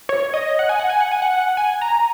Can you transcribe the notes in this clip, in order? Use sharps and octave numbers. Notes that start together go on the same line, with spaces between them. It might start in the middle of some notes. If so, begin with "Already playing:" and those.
C#5
D#5
F#5
G#5
F#5
G#5
F#5
G#5
F#5
G#5
A#5